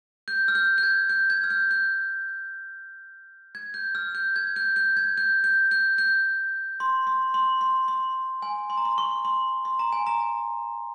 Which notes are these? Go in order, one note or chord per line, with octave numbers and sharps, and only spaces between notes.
G6
F6
G6
G6
G#6
G6
G#6
F6
G6
G6
G#6
G6
F6
G6
G#6
G6
G6
G#6
G6
G6
G6
G6
C6
C6
C6
C6
C6
G#5
C6
A#5
C6
C#6
C6
C6
A#5
G#5
A#5